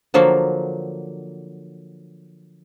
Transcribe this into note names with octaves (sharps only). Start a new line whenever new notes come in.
D3 F3 F#3 A#3